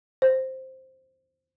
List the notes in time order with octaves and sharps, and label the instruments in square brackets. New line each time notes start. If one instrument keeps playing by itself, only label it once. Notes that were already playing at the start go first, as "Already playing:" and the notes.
[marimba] C5